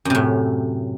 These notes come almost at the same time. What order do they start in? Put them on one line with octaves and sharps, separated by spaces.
F#2 C3 A2